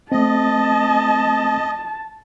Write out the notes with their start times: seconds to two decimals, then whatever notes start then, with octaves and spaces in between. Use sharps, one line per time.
0.12 A3 C4 D#5 A5